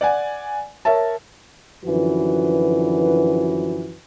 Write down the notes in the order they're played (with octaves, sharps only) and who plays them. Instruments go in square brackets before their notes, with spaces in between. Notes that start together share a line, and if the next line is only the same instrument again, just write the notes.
[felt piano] D5 F#5 G#5
A#4 C#5 E5 A5
[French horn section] F#2 D3 E3 F3 F#4 B4